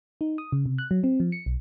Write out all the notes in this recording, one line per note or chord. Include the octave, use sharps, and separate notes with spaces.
D#4
D#6
C#3
C3
F#6
F#3
C4
F3
C#7
B1